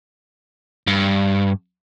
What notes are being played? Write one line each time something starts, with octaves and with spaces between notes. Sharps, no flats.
G2